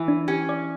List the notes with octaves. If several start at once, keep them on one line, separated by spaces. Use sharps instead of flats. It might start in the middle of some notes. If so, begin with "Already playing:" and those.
Already playing: E3
D4
C#4 G4
D5